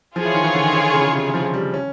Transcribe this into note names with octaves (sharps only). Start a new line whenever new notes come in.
F3 F4 G#4 C#5
E3
D#3
E3
D3
D#3
D3
C#3
C3
F3
G3
C#4